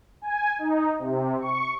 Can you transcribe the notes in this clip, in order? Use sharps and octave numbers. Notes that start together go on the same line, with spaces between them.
G#5
D#4
C3
C#6